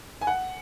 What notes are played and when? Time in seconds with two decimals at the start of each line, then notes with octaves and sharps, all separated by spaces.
0.21 G#5
0.27 F#5